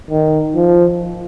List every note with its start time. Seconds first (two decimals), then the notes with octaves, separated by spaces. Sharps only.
0.10 D#3
0.55 F3